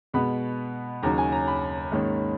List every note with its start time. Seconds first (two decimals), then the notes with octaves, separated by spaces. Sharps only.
0.13 B2 G#3 B3 B5
1.03 D#2 C#3 F#3 C#4 A#5
1.18 G#5
1.32 A#5
1.47 B5
1.91 G#2 D#3 A#3 C#4